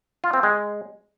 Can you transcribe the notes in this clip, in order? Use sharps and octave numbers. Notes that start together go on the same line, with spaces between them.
F4
C4
G#3